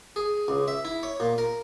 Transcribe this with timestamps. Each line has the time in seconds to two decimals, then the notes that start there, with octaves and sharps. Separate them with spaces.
0.16 G#4
0.48 C#2
0.68 E5
0.85 E4
1.03 C#5
1.20 A#2
1.38 A#4